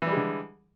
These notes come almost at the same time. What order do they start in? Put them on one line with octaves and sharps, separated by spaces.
E3 G3 G#3 D3